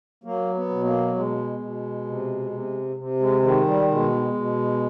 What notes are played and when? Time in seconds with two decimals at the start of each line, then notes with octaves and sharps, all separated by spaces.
0.24 F#3 A#3
0.55 B3
0.69 B2
0.84 A#3
1.15 B2 G#3
1.60 B2
2.06 C3
2.51 C3
2.96 C3
3.20 G#3
3.42 D#3 G#3
3.65 G3
3.88 B2 G#3
4.34 B2